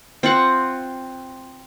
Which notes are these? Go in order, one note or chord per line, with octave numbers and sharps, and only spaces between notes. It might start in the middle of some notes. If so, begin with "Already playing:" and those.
C4 F4 F#5